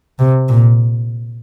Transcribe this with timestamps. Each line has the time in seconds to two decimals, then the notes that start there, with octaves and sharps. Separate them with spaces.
0.19 C3
0.49 A#2